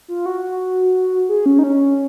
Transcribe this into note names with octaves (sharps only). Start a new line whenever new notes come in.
F4
F#4
G#4
C#4
D#4
C#4